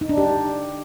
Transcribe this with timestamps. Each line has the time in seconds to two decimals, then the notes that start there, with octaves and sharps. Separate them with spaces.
0.01 D#4
0.09 D4
0.18 G4